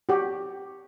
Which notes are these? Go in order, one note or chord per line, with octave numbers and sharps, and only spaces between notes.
F#4 G4